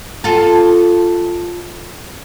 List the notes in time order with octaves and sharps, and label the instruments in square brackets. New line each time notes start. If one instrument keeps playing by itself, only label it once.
[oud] F4 A4